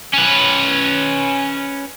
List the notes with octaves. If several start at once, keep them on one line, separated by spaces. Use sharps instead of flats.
C#4 B4